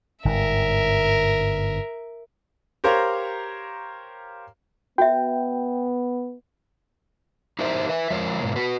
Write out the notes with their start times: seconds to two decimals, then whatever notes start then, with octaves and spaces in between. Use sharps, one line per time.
0.25 G1 G#2 A#4 E5
2.84 G4 A#4 C5 C#5 F5 A#5
4.98 B3 F#4 E5 G5
7.59 D#4 G4 A#4 C5 E5
7.89 B4 E5
8.10 F3 G#3 F4 A#4 C#5
8.41 G#2 B2 A#3
8.56 F#4 B4